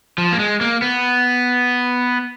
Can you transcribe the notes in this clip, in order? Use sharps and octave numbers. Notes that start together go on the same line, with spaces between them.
F3
A#3
G#3
A#3
B3